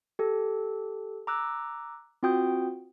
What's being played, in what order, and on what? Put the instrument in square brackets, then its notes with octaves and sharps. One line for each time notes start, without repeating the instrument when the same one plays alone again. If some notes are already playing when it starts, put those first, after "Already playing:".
[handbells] G4 A4
A#5 D6 E6 F#6
C4 F4 F#4 G5 D#6 G6